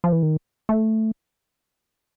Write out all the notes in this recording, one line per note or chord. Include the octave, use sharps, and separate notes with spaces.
F3
E3
D#3
A3